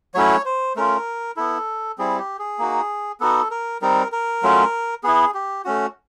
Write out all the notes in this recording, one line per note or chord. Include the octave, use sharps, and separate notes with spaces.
F#3 A3 C#4 E4 C#5
C5
A3 C#4 F4 A#4
B3 E4 A4
G3 C4 E4 G#4
G4
G#4
A#3 D#4 F#4
B3 D#4 F#4 A4
A#4
G3 C4 D#4 A#4
A#4
F#3 A3 C#4 F4
B3 E4 G#4
G4
A3 C#4 F#4